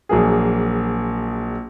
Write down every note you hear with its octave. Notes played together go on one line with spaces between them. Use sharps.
A#1 F#3 A#3 G#4